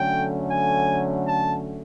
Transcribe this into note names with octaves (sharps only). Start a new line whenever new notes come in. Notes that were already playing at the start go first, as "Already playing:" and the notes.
Already playing: D3 F#3 A3 C#4 G5
G#5
A5